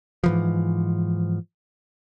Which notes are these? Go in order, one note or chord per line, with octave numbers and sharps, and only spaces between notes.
G#2 E3 F3